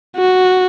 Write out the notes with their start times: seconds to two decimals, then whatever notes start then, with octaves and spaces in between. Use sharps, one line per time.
0.16 F#4